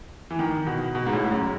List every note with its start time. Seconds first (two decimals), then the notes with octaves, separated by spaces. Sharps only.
0.31 E3
0.39 D#3
0.67 B2
0.95 B2
1.07 G#2
1.13 A2
1.26 G#2
1.32 F#2